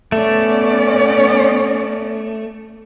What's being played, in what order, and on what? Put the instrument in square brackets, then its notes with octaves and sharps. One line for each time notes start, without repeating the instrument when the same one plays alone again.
[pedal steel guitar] A3 [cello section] B3 C#4 D5